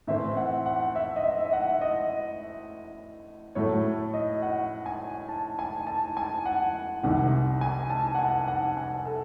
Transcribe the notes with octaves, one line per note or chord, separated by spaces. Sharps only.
A2 E3 C4 E5
F#5
F#5
E5
D#5
E5
E5
F#5
D#5
A2 F#3 A3 C#5
D#5
F#5
G#5
A5
G#5
A5
G#5
F#5
C2 C3 D#3 F#5
G#5
A5
F#5
G#5
F#5
G#5
A4